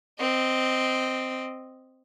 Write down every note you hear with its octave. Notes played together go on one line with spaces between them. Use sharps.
C4 D#5